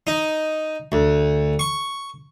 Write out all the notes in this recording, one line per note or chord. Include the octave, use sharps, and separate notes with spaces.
D#4
D2
C#6